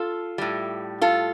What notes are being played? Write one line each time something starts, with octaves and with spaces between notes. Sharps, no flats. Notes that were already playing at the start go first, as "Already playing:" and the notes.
Already playing: F4 A4
A2 G3
F4 A4